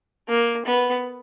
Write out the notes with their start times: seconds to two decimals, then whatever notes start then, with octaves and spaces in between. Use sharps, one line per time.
0.29 A#3
0.66 B3